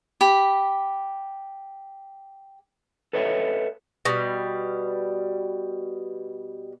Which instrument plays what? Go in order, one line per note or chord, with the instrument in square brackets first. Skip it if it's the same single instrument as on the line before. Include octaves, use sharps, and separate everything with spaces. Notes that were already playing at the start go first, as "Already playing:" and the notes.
[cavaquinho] G4 B5
[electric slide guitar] A4 B4 C#5 D#5 E5
[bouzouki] B2 G3